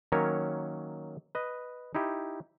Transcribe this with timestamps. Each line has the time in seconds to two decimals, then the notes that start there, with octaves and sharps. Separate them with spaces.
0.12 D#3 F#3 A#3 C#4 A#4 C#5
1.35 B4 D#5
1.95 D#4 E4 G4